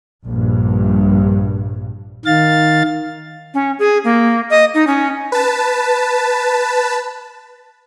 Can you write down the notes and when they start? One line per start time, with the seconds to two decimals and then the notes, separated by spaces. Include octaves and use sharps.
0.24 A#1 G2
2.25 D#3 F5 A6
3.54 C#4
3.79 G#4
4.04 A#3
4.51 D#5
4.74 D#4
4.87 C#4
5.32 B4 A5